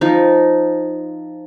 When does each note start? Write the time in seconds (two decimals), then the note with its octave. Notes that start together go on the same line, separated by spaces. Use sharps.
0.01 F3 D#4